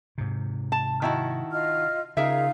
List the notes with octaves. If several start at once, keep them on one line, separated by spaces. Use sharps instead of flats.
G#2 C3
A5
D#3 E4 F#4
F4 D#5 F6
C#3 D#4 F4 G#4 A#4 E5 F5